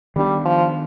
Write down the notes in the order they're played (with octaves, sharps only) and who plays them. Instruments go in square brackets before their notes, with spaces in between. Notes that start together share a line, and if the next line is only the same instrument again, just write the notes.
[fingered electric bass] D#3 B3 D4 [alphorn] G3
[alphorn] F3